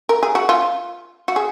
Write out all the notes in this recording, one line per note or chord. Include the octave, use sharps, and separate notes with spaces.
A#4
G#4
F#4
F4
F#4
G#4